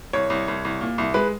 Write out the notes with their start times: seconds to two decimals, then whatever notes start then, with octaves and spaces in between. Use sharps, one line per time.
0.13 C2 C#5
0.30 C2
0.48 C2
0.65 C2
0.81 A#2
0.98 C2
1.14 G#3 B4